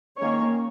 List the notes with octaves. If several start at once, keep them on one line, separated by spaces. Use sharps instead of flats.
D#3 A#3 C#4 C#5